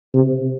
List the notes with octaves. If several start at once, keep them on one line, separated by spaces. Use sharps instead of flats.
C3